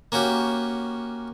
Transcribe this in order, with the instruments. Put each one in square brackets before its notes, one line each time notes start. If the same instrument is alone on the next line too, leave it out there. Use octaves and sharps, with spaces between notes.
[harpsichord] A#3 C#4 F#4 G4